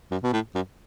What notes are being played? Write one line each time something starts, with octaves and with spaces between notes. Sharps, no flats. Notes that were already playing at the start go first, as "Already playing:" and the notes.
F#2
B2
A2
F#2